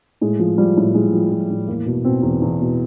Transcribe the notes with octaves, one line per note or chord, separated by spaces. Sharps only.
A2 G#3
F3
F3 G3
A2
A2 G#3
F3
F3
A2
E2 A#3
B2
B2 C4
E2
E2
B2